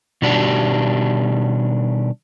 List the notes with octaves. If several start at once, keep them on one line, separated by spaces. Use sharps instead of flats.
B2 D#3 G3 D4 F#4 G4